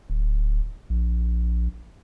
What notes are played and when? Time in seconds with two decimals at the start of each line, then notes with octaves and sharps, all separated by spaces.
0.10 D1
0.90 A#1